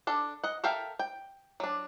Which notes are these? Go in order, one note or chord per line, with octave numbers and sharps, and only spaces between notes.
D4 A4
D#5 F#5
A4 A#4 E5 F5 G5
G5
F#3 D4